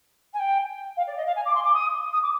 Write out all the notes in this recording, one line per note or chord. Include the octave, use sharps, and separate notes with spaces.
G#5
G5
F5
D5
D#5
F5
G#5
D6
C6
D6
D#6
D#6
D6